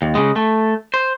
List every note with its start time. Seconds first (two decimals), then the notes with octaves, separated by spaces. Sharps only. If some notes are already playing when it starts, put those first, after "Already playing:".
0.02 D#2
0.15 C#3 G#3
0.36 A3
0.94 C5